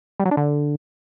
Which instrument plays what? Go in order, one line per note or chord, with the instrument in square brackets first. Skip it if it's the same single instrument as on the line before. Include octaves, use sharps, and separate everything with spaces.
[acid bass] G3
F#3
D4
D3